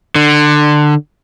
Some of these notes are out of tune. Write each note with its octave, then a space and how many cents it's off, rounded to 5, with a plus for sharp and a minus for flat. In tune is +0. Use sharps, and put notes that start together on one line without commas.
D3 +20